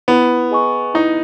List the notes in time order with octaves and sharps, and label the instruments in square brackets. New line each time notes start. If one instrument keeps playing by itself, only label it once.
[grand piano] B3 [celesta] E4
[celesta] G#4 D#5 G#5 C#6
[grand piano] D#4 [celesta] E4